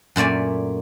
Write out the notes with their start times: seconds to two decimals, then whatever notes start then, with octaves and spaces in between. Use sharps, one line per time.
0.16 F#2 A#2 A3 D5 G#5